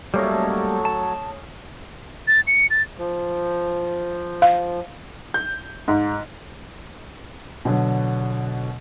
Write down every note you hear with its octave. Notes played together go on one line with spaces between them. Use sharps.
A2 F#3 G3 A#3 C#4 A4 C#5 D#5
A5
A6
C#7
A6
F3
F5
G6
G#2
B2 D3 F#3